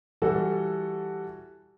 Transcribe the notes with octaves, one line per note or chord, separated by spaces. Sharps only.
E3 G3 F#4 A4